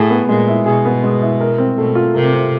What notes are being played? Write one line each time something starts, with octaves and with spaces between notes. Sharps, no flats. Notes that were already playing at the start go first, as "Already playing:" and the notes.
Already playing: A2 G#4
B3
A#2 G#3
E4
B2 G#4
B3
G#3
E4
A#4
C4
B2 A3
F4
C3 A#4
C4